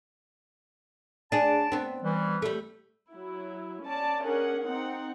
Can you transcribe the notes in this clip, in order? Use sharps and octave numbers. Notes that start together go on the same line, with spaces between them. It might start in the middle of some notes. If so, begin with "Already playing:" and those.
D4 G#4 D5 A5
B3 C4
E3 G3
G3 A3
F#3 E4
C#4 D5 A5
C#4 D4 G#4 A#4 F#5
C4 D#4 F#5